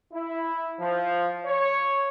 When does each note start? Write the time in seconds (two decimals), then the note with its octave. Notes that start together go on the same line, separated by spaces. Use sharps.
0.13 E4
0.80 F3
1.46 C#5